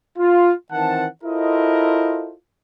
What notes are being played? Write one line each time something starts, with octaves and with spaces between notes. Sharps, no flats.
F4
D#3 E3 C4 F#5 A5
E4 F4 A4 A#4 C5 D#5